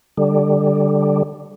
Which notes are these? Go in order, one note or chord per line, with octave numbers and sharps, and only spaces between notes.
D3 G3